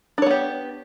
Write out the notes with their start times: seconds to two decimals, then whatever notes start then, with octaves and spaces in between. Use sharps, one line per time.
0.18 D4
0.22 C#5
0.26 B3
0.31 G4